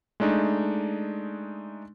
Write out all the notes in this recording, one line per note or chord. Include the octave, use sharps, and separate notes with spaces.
G#3 A3 D4 D#4